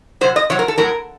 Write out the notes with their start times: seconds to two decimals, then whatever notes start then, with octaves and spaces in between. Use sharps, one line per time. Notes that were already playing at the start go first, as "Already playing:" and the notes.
0.21 F#3 C5
0.24 C3
0.36 D#5
0.50 C3 F#3 C#5
0.59 A#4
0.68 A4
0.78 A2 F#3 A#4